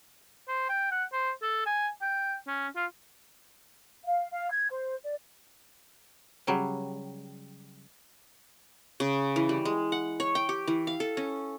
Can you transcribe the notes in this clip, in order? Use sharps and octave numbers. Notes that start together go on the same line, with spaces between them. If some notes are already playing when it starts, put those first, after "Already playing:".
C5
G5
F#5
C5
A4
G#5
G5
C#4
F4
F5
F5
G#6
C5
D5
C#3 F#3 G3
C#3
E3
G3
G#3
F#5
C#5
G5
G4
E3
F5
A4
C#4